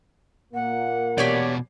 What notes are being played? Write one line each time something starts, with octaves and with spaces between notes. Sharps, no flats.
A#2 A#3 F#5
E2 B2 G4 C#5 D5